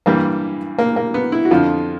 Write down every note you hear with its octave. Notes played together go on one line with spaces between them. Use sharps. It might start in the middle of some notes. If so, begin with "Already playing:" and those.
G2 E3 G3 A#3
A#3
A#3
B3
E4
F#4
F2 D3 F3 F4